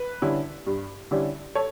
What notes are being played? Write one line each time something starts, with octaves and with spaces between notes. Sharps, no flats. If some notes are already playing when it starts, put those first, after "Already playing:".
Already playing: B4
D3 G3 C#4 E4
G2
D3 G3 C#4 E4
A4 C#5